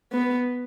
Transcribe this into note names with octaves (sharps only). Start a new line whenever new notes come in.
B3